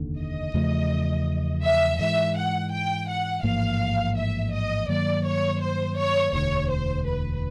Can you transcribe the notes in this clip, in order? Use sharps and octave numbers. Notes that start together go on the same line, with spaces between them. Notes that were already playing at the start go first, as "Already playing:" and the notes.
Already playing: F1 D#2 D3
D#5
E2 C#3 F3 A3
E5
G#2 E3 G#3 E5
F#5
G5
F#5
A1 G#2 F3 A#3 F5
E5
D#5
G2 D#3 F#3 A#3 D5
C#5
C5
C#5
E1 D2 D3 C#5
C5
B4